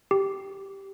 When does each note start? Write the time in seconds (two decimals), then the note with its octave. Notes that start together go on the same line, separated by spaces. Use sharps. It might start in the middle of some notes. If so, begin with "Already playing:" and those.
0.11 G4